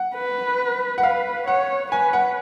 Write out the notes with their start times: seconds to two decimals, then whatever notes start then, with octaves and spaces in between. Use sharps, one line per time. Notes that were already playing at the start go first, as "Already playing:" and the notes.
Already playing: F#5
0.15 B4
0.98 F#5
1.03 B4 F5
1.47 C#5 F#5
1.92 B4 G#5
2.13 F#5